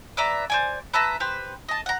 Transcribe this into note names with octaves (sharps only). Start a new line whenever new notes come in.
B4 D5 E5 A#5
C5 D5 G#5
B4 E5 A5 A#5
G4 B4 C5
D#5 A5
F#5 A#5